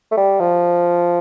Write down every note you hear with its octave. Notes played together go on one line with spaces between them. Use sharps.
A3
G3
F3